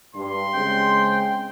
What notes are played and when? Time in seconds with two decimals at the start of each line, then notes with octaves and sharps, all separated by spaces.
0.15 G2 C6
0.54 C#3 G#3 C4 G5